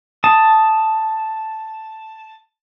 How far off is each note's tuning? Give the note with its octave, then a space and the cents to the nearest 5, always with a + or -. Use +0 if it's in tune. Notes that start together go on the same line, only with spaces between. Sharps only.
A5 +0 D#6 +0